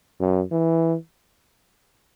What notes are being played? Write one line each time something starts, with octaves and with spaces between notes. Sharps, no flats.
F#2
E3